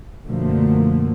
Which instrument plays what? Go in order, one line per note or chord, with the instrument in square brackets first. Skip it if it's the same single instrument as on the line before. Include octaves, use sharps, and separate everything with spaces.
[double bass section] F#2 B2 D3 F3 A3 A#3